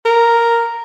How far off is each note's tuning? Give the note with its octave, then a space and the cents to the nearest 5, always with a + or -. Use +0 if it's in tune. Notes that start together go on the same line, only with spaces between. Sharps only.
A#4 +0